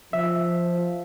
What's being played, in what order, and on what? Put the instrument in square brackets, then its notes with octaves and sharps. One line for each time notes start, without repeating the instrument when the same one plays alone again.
[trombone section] F3 [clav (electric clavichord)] E5